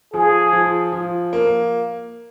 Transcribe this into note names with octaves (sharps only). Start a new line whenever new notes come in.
F3 G#4
F3
F3
A#3